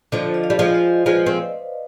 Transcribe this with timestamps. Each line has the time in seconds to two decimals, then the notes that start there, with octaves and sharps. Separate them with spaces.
0.12 D3 F3 C5 D#5
0.34 D#5
0.44 D5 F5
0.50 G3
0.59 F3 G#3
0.74 C5 D#5
1.06 F3 G#3 B4 D5
1.26 C4